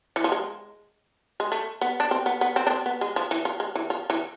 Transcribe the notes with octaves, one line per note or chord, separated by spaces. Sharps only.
E3
F3
G#3
G#3
A3
B3
D4
C4
B3
B3
C4
D4
C4
B3
G#3
F3
E3
F3
G#3
E3
F3
E3